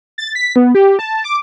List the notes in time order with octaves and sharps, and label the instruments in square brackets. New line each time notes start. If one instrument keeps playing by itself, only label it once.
[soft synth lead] A6
B6
B3
G4
A5
D6